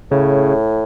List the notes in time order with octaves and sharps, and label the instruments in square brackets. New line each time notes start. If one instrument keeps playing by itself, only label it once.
[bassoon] A2 [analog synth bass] C#3